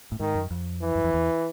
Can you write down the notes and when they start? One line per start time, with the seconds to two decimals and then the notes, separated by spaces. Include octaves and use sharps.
0.12 A2
0.20 G#2 D#3
0.35 F#2
0.51 F2
0.82 E3
0.95 F#2
1.04 F2
1.14 E2